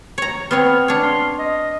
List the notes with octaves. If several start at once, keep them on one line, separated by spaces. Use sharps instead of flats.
C#5 A#5
B3 C4 C#5 F6
D4 C#5
C6
D#5